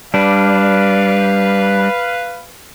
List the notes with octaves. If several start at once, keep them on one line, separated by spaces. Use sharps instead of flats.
G3 D4 B4 F5